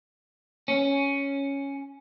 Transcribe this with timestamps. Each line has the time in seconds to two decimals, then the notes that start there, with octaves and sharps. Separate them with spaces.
0.68 C#4